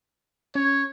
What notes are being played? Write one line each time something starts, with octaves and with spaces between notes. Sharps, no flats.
C#4 C#5